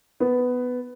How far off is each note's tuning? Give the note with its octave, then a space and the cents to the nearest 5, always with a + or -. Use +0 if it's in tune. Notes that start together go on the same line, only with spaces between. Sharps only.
B3 +10